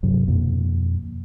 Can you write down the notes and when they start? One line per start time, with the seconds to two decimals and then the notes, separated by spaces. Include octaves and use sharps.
0.03 G2 C3 F#3
0.28 F2 B2 D3 A#3